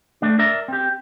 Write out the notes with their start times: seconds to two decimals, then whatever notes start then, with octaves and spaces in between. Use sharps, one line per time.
0.22 A3 D4
0.39 A#4 D5 E5 A#5
0.68 C4 G4